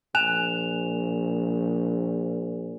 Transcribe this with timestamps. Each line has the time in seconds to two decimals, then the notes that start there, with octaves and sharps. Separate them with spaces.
0.15 A#1 G#5 F#6 E7 F7